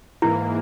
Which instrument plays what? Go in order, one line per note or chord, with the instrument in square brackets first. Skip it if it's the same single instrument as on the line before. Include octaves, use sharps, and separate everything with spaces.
[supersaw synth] G#2 E3 A#3 [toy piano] E4